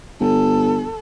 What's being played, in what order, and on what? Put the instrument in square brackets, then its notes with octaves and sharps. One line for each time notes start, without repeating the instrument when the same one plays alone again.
[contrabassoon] G1 [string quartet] A4